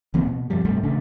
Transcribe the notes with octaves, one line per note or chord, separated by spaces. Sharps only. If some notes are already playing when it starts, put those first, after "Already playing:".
D1 E3 A#3 C4
B2
F#2 C3 F3 G3
G#2 C3 G3 A3
A1 C#3 A3 D4